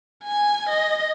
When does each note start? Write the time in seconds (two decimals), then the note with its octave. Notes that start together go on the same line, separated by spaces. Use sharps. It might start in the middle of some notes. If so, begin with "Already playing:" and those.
0.24 G#5
0.69 D#5